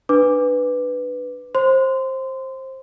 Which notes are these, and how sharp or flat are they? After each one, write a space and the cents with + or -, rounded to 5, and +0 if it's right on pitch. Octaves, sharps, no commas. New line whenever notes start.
D4 +15 B4 +5 D6 +0
C5 +15 C6 -25